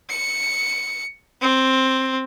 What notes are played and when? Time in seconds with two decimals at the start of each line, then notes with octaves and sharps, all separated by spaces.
0.10 C#7
1.41 C4